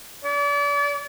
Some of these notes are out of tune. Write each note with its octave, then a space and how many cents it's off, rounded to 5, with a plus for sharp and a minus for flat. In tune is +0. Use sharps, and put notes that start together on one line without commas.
D5 -40